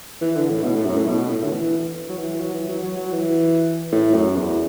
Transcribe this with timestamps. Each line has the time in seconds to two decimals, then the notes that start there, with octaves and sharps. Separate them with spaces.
0.21 E3
0.36 D3
0.49 A2
0.64 B2
0.76 A2
0.87 F#2
0.97 A2
1.08 B2
1.29 A2
1.43 D3
1.51 E3
2.09 F#3
2.17 E3
2.39 F#3
2.54 E3
2.69 F#3
2.83 F#3
2.97 F#3
3.12 E3
3.92 A2
4.14 F#2
4.35 E2